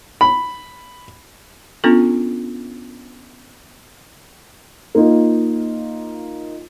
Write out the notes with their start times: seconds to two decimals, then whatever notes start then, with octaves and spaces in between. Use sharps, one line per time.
0.21 B5
1.84 B3 C#4 D4 F4 A4
4.95 A#3 D#4 F4